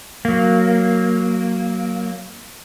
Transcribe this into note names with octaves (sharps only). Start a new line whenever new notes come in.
F#3 A#3